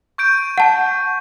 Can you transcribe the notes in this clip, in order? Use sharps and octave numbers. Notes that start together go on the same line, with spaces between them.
C#6 G6 D7
F#5 A5